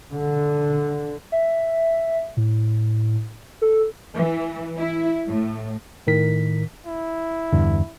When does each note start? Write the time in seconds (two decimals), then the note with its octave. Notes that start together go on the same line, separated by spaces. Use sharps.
0.14 D3
1.32 E5
2.37 A2
3.62 A4
4.16 E3
4.77 E4
5.27 A2
6.07 A2 D#3 A#4 B6
6.86 E4
7.53 E2 G2 D3